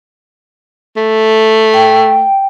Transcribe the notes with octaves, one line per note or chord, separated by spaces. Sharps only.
A3
G5